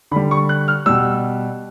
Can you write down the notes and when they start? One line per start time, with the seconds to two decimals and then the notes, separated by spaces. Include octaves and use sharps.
0.11 D3 B5
0.16 G3
0.31 C#6
0.49 F#6
0.68 F6
0.86 B2 G3 E6